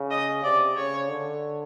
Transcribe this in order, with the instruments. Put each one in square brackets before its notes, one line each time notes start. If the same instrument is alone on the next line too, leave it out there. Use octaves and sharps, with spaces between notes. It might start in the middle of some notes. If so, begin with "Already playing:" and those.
Already playing: [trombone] C#3
[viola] D#5
[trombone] C3 [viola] D5
[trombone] C#3 [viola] C#5
[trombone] D3